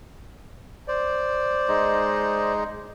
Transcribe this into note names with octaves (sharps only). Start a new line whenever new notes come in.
C5 D5
G#3 D#4